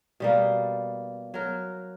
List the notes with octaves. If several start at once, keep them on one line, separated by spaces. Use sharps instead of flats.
B2 G3 A#3
F#3 A#4